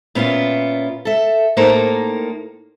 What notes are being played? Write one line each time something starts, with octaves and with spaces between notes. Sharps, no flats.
A#2 B3 C#4 E4 F4
A4 E5
A2 A#3 D#4 A4 A#4 C5